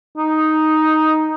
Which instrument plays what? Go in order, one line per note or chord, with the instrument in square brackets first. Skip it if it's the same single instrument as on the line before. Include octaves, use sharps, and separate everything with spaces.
[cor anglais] D#4